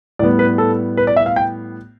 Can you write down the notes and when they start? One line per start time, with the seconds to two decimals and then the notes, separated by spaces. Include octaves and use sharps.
0.19 A2 G3 B3 D5
0.39 B4
0.58 A4
0.97 B4
1.07 D5
1.16 E5
1.26 F5
1.36 G5